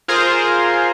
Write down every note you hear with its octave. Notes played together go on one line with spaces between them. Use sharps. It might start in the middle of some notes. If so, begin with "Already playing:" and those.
F4 G#4 A#4 C5